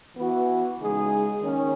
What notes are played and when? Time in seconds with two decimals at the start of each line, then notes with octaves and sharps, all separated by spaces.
0.17 E3 B3 F#4
0.79 C#3 G#3 D#4 G#4
1.41 D#3 A#3 C#4